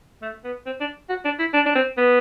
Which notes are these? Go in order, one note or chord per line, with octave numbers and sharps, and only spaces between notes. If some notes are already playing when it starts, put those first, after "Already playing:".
A3
B3
C4
D4
F#4
D4
E4
D4
D4
C4
B3